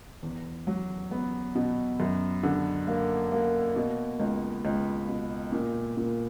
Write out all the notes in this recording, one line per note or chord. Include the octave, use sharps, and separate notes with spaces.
E2
F#3
B3
B2
F#2
D3
A#3
A#3
B2
C#2
C#2
B2
A#2
A#2